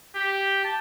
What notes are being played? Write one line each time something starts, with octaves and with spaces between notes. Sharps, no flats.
G4
A5